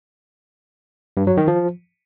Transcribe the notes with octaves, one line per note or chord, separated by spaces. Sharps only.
G2
F#3
D#3
F3